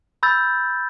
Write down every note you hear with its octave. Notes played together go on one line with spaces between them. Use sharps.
B5 E6 G6 A6